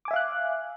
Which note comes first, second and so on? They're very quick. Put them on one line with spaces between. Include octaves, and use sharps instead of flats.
D6 G#5 E5 F5 F#6